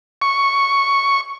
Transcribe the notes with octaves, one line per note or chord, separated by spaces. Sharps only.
C#6